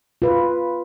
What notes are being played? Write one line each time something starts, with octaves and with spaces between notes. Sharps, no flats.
F4 B4